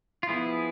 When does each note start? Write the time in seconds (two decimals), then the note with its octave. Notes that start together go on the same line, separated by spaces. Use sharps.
0.23 F4
0.29 F3 B3 E4 G#4